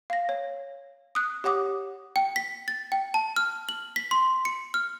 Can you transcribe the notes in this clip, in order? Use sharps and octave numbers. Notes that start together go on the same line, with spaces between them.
F5 A#6
C#5
D#6 F#6
G4 C#5 F#5 D6 D#6
G5
B6
A6
G5
A5
F6
F#7
B6
C6
C#7
F6